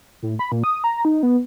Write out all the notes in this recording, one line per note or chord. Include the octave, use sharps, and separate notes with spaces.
A2
B5
A#2
D#6
A#5
D#4
B3